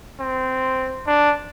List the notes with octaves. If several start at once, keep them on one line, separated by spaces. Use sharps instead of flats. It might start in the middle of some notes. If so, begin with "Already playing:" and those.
C4
D4